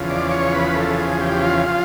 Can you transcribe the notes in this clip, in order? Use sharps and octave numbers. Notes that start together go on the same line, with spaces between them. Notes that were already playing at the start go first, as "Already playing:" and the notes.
Already playing: E2 C#3 F3
D5
C#5
B4
A4
G#4
G4
F4
F3 F4